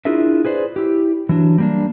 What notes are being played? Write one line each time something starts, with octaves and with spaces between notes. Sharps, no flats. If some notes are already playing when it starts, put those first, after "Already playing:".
D4 E4 F4 G#4 A#4 E5
G#4 B4 C5 D5
E4 G4
E3 F#3 D4
G3 A#3 D4